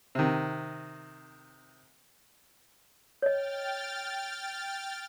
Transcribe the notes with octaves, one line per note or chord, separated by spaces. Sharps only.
C3 D#3
C#5 D#5 G5 F6 A6